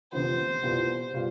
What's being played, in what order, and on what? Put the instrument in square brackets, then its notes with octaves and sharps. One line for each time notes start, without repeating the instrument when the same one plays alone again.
[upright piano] D2 C3 F3 B3 [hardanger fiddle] C5
[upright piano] C2 B2 G3 B3 F4
B2 G3 B3 F4